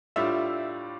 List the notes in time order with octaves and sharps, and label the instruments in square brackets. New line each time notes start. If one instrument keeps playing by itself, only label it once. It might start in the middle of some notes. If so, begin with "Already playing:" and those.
[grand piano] A2 G3 D4 F4 [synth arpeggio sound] E5